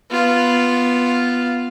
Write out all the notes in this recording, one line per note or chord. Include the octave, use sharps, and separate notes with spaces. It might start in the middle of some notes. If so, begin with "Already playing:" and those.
B3 F4